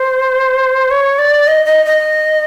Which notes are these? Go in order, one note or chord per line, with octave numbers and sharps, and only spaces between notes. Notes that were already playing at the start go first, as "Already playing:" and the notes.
Already playing: C5
C#5
D5
D#5
D#5
D#5